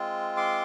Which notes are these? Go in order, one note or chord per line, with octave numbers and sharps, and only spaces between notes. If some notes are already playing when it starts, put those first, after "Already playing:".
Already playing: G#3 C4 F4
C6 D6